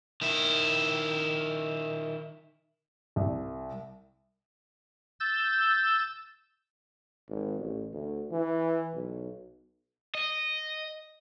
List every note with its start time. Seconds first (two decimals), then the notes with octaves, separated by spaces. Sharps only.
0.21 D#3 E4
3.16 C2
5.20 E6 G6 A6
7.29 G#1
7.59 A1
7.93 D2
8.31 E3
8.94 B1
10.15 D#5